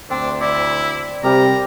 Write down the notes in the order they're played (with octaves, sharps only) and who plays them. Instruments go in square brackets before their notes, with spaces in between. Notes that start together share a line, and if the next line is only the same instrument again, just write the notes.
[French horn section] D2 [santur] C4 [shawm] D4
[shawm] E4 [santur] D5
[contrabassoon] C3 [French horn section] G3 [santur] G4 A#4 D5 [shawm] A#5